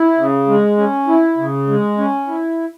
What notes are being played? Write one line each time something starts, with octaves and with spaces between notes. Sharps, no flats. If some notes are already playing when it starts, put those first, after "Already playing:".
Already playing: E4
C#3
G#3
C#4
E4
C#3
G#3
C#4
E4